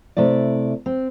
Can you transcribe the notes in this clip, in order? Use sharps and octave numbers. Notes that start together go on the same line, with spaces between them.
C3 A3 E4 D5
C4